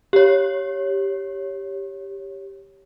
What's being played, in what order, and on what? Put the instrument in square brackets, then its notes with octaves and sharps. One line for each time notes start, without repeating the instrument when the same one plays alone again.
[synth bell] G4 C#5